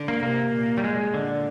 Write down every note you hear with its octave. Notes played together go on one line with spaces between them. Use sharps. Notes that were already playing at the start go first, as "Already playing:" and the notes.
Already playing: D3
A#3
C3 A#3
A#2
G3
A#2 G#3
D3